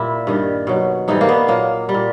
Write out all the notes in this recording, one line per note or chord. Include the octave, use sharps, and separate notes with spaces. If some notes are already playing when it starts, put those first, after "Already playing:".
Already playing: A#2 G3 E4
G2 D#3 G3
B2 F#3
G#2 E3 G3 D#4
A#3
B3
A#2 F#3 A#3
G3
A#2